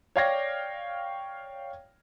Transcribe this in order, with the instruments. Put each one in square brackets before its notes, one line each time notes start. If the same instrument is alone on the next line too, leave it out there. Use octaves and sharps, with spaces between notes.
[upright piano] C#5 D5 F5 G5 G#6 A#6